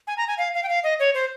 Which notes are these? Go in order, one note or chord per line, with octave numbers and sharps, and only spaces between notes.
G#5
A#5
G#5
F5
F5
G5
F5
D#5
C#5
C5